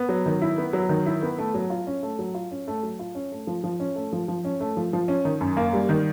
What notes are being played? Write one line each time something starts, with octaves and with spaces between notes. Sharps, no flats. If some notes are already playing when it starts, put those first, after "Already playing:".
Already playing: B3
F#3
D#3
E4
B3
F#3
D#3
E4
B3
A3
F#3
F4
C#4
A3
F#3
F4
C#4
A3
F#3
F4
C#4
A3
F3
F3
C#4
A3
F3
F3
C#4
A3
F3
F3
C#4
D#3
F#2
A#3
G3
D#3